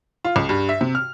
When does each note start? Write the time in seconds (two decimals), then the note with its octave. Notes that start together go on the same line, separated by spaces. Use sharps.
0.25 F4
0.36 C#2
0.49 G2
0.69 E5
0.81 C3
0.95 F6